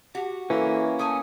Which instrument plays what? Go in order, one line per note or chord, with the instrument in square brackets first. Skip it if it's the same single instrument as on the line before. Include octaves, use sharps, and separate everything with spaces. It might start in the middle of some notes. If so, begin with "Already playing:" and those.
[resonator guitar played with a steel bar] F#4 [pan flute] G4
[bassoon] E3 [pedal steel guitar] A#3 C#4 [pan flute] A4
[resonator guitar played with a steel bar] A3 G#5 [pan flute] D#6